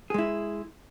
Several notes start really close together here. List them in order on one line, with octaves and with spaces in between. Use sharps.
G#4 G#3 E4